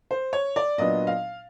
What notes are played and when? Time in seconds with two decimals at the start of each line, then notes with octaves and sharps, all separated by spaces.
0.11 C5
0.33 C#5
0.56 D5
0.78 A#2 F#3 B3 D4 D#5
1.07 F5